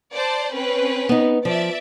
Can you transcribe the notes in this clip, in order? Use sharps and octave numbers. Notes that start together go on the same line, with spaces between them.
C5 D5 A5
C4 C#4 B4
B3 D#4
F3 D5 E5